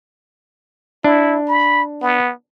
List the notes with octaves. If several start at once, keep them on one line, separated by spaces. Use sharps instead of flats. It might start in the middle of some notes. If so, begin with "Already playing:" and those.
D4 E4
B5
B3